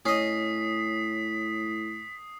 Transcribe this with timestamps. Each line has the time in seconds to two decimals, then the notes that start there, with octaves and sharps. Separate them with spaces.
0.06 A2 C#4 D#5 D#6 B6 C7